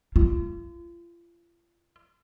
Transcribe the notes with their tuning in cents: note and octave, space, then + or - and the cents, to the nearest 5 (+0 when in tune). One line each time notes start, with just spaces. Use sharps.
F4 -40